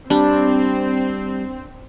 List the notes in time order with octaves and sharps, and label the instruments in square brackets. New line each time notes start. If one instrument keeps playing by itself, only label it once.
[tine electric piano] G3 [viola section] C4 [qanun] D4